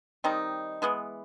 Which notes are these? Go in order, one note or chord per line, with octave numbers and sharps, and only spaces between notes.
D#3 G3 C4 D#4
E3 G#3 B3